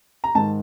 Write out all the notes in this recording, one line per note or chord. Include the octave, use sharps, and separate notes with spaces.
A#5
G#2 D#3 G#3 A5